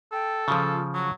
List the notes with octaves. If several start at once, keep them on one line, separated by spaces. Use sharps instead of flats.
A4 G5
C#3 F3 F4
F#3 C#6